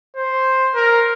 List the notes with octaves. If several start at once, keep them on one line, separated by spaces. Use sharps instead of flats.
C5
A#4